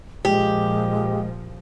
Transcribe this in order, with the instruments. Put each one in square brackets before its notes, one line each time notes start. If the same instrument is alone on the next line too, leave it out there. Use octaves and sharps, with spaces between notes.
[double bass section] A#2 F3 [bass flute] G#3 [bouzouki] G4